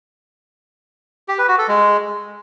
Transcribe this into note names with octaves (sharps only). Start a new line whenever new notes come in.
G4
B4
F#4
A4
G#3